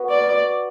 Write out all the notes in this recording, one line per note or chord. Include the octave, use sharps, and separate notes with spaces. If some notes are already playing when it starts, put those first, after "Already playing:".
Already playing: B3 F#4 B4
D5